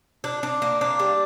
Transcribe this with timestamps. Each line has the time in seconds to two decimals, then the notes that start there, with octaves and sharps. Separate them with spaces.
0.24 D4
0.43 D4
0.62 A#3
0.81 D4
1.00 G3